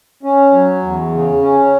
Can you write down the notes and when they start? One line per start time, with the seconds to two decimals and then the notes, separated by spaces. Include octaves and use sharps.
0.23 C#4
0.52 F#3
0.82 E2
1.12 C#3
1.41 C#4